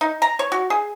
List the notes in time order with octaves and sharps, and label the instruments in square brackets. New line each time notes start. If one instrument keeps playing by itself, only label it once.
[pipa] D#4
A#5
C#5
F#4
G#4